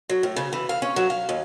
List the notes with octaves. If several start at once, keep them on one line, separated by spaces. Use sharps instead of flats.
F#3
A2
C#3
E3
F5
C#4
F#3
F5
D#2